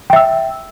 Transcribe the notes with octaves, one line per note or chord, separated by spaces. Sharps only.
E5 G5 E6